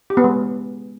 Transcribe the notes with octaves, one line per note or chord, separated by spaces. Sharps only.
G4
B3
G#3